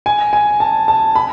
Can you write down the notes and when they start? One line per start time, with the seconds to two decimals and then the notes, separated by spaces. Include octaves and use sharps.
0.06 G#5
0.33 G#5
0.60 A5
0.88 A5
1.15 B5